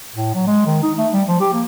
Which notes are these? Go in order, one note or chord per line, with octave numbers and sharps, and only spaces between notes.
A2
F#3
G#3
D#3
D#4
A3
G3
F3
G4
A#3